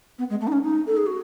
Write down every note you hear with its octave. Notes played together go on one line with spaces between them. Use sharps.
B3
G#3
A3
D#4
C#4
D#4
A4
G#4
F#4